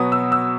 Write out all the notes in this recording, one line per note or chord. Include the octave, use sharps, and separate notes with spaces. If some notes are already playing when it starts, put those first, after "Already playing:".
Already playing: B2 F#3 B3 D#6
E6
E6